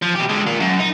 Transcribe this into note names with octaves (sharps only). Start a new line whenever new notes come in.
F3
B2 G4
D3 G#3
F4 A#4
F#2
D#4